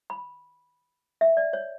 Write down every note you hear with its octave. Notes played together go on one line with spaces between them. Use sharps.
B5
E5
D5
C#5